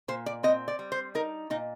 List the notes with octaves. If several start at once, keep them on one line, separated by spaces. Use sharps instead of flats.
A#2 C5
D5
C4 D#5
D5
G3
C5
D#4 A#4
A#2 D#4